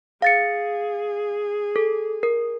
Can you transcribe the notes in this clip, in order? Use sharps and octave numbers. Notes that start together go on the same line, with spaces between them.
G#4 F5 A6 C#7
A4
A#4